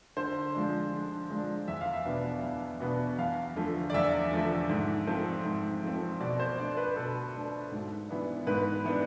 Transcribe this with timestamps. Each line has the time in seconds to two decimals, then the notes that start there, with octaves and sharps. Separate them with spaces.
0.17 D3 C5
0.55 F3 G#3 D4
0.93 D3
1.30 F3 G#3 D4
1.68 E2 E5
1.81 F5
1.93 E5
2.05 B2 B3 D4
2.43 E2
2.80 B2 B3 D4
3.19 E2 F5
3.56 D3 F3 A3
3.90 D5
3.94 E2 E5
4.32 D3 F3 A3
4.69 G#2
5.07 F3 A3 C4
5.45 G#2
5.83 F3 A3 C4
6.20 B2 D5
6.40 C5
6.58 A3 D4 D5
6.77 B4
6.96 B2 A4
7.34 A3 D4
7.71 G#2
8.09 E3 B3 D4
8.47 G#2 B4
8.85 E3 B3 D4